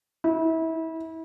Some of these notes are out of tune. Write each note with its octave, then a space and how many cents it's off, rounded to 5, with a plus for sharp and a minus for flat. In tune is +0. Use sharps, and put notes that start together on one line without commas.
E4 -30